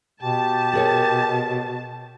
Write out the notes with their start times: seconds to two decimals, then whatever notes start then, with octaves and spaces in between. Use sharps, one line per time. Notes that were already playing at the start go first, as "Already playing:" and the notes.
0.23 B2 G4 A5
0.73 G#4 A#4 C#5